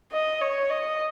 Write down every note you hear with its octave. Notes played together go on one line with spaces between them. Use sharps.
D#5
C#5
D#5